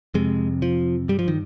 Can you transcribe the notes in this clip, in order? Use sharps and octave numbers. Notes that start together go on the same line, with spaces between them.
F2 C3 G#3
F3
G2 G3
F3
D#3